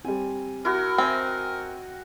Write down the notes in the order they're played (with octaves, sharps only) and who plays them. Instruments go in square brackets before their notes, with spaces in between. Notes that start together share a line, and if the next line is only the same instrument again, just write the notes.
[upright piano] G3 C4 [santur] G#5
[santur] E4 F#4 [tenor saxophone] A#4
[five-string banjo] C4 [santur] D#5 G#5 [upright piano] G5